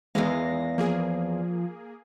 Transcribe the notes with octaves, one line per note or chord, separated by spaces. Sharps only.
E2 D#3 E3 G#3 F5 A#6
F3 A#3 G#4